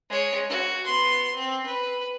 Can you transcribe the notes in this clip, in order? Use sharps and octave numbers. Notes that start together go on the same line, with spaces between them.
G#3 C#5
F#4
B3 C6
C4
B4